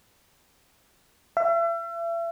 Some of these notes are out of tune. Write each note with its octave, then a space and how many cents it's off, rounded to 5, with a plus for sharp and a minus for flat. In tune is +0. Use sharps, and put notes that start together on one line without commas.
E5 +40